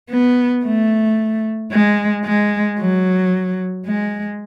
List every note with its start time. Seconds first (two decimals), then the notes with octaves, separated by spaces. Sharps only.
0.10 B3
0.64 A3
1.71 G#3
2.25 G#3
2.79 F#3
3.86 G#3